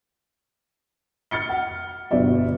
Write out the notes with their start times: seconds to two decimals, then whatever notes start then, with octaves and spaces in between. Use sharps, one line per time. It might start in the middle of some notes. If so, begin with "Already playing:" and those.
1.31 F6 A6 C#7 G7
1.49 F#5
2.11 G1 B2 F#3 D5 E5